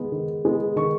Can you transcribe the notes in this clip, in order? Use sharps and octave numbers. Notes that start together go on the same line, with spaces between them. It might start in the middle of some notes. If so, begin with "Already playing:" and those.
Already playing: D#3 G#3 B3
D#3
G#3 B3
D#3 C#6